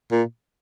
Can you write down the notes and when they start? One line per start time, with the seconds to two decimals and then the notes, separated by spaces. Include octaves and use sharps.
0.11 A#2